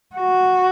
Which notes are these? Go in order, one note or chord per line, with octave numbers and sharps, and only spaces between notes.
F#4